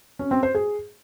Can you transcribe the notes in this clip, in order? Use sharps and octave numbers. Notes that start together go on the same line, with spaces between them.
C#4
C4
C5
G#4